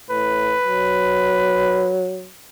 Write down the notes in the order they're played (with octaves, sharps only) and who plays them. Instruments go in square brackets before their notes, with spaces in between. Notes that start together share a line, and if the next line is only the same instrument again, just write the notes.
[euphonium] A2 [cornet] B4
[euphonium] F#3